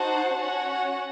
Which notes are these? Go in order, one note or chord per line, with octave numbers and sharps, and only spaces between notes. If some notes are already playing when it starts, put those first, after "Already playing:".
Already playing: D#4 F#4 C5 F#5 A5
C#4 F#4 C#5 F#5